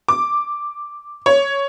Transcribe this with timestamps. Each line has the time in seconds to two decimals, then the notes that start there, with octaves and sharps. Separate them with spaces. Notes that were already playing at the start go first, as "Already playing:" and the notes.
0.08 D6
1.26 C#5